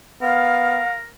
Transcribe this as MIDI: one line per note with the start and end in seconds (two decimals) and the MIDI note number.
0.22 0.82 59
0.22 1.08 70
0.22 0.91 77